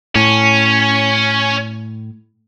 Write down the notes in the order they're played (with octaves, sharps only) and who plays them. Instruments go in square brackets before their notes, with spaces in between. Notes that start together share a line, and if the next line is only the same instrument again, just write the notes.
[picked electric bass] A2 [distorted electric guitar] C#4